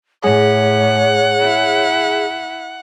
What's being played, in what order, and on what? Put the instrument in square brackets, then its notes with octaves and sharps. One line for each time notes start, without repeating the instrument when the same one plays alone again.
[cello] A2 [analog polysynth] G#4 [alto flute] C#5 [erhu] F#5
[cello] E4